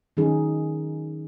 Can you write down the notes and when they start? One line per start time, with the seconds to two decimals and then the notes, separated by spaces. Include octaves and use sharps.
0.17 D#3 F#3 C#4 D#4 G#4